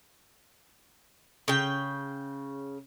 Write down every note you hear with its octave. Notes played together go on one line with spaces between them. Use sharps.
C#3 G5